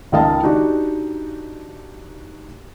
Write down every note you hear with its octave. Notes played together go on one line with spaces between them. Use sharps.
C#2 D#3 A#4 D#5 F5 A5
D4 D#4 F#4 G4 D5